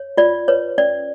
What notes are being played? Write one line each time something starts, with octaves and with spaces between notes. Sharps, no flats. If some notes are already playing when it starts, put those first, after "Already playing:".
Already playing: C#5
F4 D5
B4 C#5
C#4 D5